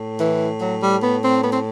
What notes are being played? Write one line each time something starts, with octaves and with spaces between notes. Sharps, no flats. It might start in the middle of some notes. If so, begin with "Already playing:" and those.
Already playing: A2
E3
F#3
G3
B3
C4
B3
C4